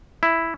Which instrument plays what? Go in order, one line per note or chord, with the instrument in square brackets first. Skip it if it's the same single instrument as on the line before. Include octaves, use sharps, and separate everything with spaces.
[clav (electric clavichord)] E4